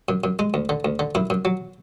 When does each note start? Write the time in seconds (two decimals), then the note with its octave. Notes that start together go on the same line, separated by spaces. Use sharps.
0.09 F#2
0.24 F#2
0.39 G#3
0.54 D2
0.69 D3
0.85 D2
0.99 D3
1.15 F#2 E4
1.30 F#2
1.45 F#3